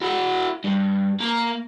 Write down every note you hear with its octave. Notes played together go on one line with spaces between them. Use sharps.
E4 F#4
G2
A#3 A#5